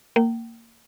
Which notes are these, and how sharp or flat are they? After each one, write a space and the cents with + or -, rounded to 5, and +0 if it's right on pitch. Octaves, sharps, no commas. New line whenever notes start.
A#3 -20 G5 -35